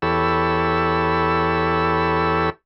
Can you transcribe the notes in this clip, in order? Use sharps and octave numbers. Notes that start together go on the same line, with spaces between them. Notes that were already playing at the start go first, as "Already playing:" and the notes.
E2 G4 A4 C#5 B5 E6